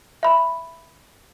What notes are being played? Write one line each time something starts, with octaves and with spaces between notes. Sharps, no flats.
E5 B5